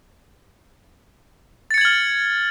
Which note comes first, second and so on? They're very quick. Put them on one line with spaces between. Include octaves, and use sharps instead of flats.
A6 C#7 G#6 F#7 F6